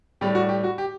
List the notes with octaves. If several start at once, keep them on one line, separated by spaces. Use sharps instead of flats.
A2 G3 G4
F#4
G4
F#4
G4